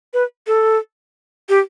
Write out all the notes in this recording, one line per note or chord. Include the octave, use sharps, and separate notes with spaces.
B4
A4
G4